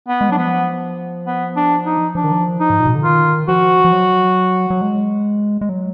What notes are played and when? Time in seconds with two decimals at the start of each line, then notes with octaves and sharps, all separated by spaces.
0.08 B3
0.21 G#3
0.29 F#3 D4
0.37 F3 B3
1.27 B3
1.56 D4
1.86 D#4
2.15 F3 D4
2.24 D#3
2.32 F3
2.60 D#4
2.70 G#2
2.79 A#2
2.87 B2
2.95 D3
3.04 D#3 F4
3.48 F3 F#4
3.85 F3
3.92 F#3
4.70 F#3
4.81 G#3
5.61 G#3
5.69 F#3